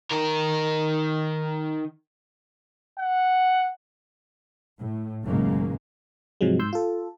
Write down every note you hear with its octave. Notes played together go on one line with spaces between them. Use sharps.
D#3 A#4
F#5
A2
F#1 D#2 A2 C#3 G#3 A#3
G#2 C3 F3 F#3 G#3
G#2 C6 E6 G6
F4 A4